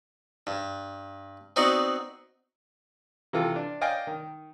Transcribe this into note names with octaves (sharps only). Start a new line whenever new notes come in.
G2
B3 C4 D#4 F#4 D5 F#5
C3 E3 F4 A4
D4
D5 D#5 F5 G5 G#5
D#3